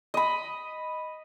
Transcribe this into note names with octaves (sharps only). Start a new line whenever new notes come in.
D#5 B5